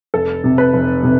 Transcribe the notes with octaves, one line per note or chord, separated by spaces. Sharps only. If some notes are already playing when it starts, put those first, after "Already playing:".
F1 A4
C3
B4
F1
C3